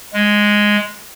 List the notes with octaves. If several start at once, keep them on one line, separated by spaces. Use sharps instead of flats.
G#3